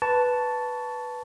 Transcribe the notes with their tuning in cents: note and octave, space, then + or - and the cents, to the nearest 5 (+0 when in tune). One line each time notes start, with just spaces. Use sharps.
B4 +0 A5 +0 C#6 +20